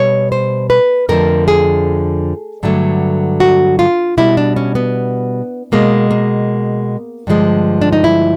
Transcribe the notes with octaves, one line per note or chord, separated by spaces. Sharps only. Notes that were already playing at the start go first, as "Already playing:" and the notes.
Already playing: B2 G3 C#5
C5
B4
F2 D3 F3 A3 A#4
G#4
G2 D3 F#3 A3
F#4
F4
B2 G3 E4
D4
C#4
B3
B2 G#3 A#3
A#3
G2 D3 F3 G#3
D4
D#4
E4